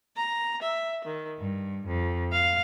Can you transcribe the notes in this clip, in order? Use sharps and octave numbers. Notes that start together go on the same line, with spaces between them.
A#5
E5
D#3
G2
F2
F5